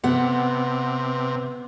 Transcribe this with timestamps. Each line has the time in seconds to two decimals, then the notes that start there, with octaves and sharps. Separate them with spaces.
0.04 C3 B3 F#5